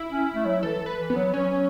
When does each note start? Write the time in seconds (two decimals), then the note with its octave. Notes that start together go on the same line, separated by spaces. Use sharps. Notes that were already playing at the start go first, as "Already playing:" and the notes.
Already playing: E4
0.10 C#4
0.35 A3
0.45 F#3
0.63 E3 A4
0.86 B4
0.99 E3
1.10 B3
1.16 F#3
1.34 F#3 C#4